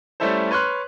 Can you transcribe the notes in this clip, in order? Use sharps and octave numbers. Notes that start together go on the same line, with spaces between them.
G3 A3 C#4 E4 A4 C5
B4 C#5 C6 F6 F#6